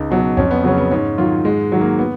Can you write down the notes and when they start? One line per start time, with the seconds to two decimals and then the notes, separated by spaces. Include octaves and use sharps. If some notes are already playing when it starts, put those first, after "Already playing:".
Already playing: C#2 D#4
0.11 B2 F#3
0.37 F2 C#4
0.51 B3
0.64 C#3 F#3 C#4
0.78 B3
0.91 G#2 C#4
1.18 D#3 F#3 F4
1.45 G#2 G#3
1.72 D#3 F#3
1.81 A#3
1.99 B3